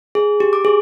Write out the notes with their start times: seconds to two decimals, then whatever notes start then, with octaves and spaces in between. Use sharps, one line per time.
0.15 G#4
0.40 G4
0.53 D6
0.65 G#4